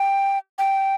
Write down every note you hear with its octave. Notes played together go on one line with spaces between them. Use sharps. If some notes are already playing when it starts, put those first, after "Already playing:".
Already playing: G5
G5